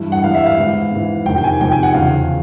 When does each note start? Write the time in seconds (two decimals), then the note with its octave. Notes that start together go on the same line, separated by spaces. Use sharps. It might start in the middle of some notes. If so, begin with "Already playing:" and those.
Already playing: G2 E3
0.12 F#5
0.24 G2 E3 F5
0.35 E5
0.46 F5
0.58 G#2 E3
0.92 G#2 E3
1.26 F2 C3 D#3 G5
1.38 G5
1.44 G#5
1.61 F2 C3 D#3 G5
1.72 G#5
1.83 F#5
1.94 E2 C#3 F3 F5